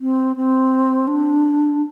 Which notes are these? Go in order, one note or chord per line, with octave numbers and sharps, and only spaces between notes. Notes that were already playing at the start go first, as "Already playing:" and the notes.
C4
C4
D4